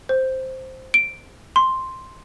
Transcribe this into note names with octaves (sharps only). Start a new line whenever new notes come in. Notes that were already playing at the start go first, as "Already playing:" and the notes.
C5
D7
C6